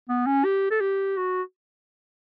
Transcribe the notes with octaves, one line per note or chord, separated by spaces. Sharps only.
B3
C#4
G4
A4
G4
F#4